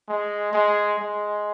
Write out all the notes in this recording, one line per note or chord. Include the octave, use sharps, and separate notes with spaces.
G#3
G#3
G#3